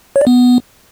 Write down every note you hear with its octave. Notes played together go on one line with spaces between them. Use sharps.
C#5
D5
B3